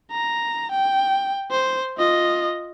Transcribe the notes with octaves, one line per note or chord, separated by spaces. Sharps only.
A#5
G5
C5
F4 D#5